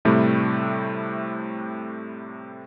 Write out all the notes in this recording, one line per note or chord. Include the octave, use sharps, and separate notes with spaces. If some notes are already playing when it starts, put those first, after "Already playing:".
A2 C3 G3 A3 E4